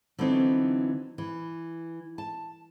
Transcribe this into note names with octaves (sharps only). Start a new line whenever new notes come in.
D3 E3 F#3 B3 C4 D#4
E3
A5